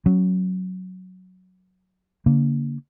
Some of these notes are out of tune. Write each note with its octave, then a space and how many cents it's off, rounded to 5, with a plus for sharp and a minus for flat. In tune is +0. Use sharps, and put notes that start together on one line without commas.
F#3 +0 C#4 -15
D3 -40 A#3 +0